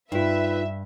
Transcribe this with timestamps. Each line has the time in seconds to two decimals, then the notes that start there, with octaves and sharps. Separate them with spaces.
0.12 G2 D#4 F4 B4 E5